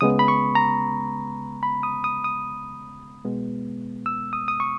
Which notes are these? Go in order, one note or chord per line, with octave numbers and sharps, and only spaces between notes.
C#2 C#3 G#3 B3 D#6
B5
C#6
A#5
B5
D#6
D#6
D#6
B2 G#3 B3
E6
D#6
D#6
C#6